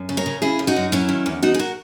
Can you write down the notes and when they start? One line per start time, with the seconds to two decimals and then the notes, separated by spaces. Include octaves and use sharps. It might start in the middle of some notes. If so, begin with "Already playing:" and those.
Already playing: F#2
0.09 C#3
0.17 A#4 C#5
0.26 C#3
0.42 C#3 E4 G#4
0.59 F#2
0.67 D#4 F#4
0.76 F#2
0.92 F#3 C#4 E4
1.09 D#3
1.26 E2
1.42 E2 D#4 F#4
1.54 G#4
1.59 F#4 A#4